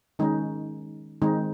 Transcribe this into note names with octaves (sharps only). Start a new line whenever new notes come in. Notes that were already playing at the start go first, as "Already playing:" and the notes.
D#3 G#3 C#4 D#4
D#3 G#3 C4 D#4